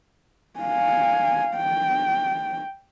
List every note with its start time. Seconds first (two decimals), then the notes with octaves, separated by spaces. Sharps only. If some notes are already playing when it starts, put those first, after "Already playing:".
0.60 F5 G#5
1.56 G5